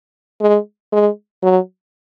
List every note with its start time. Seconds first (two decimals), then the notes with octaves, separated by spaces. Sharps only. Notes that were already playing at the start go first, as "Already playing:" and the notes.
0.41 G#3
0.92 G#3
1.43 F#3